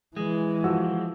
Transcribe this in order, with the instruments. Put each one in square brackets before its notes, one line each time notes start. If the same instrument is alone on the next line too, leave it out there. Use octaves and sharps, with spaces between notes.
[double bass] E3 [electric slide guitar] G#3
[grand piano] F3 F#4 E6